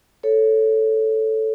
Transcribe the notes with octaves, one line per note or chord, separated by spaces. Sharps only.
A4 C#5